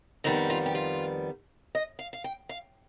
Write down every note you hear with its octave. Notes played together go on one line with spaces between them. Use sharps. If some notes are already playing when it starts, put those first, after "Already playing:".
F2 D#3 G3 B3 D#4
F4
G4
F4
D#5
F5
F5
G5
F5